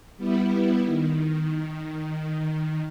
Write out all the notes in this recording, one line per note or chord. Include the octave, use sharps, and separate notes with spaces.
G3 B3 E4
D#3